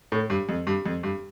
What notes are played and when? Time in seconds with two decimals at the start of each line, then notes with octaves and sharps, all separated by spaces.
0.12 A2
0.30 G2
0.49 F2
0.67 G2
0.86 F2
1.03 G2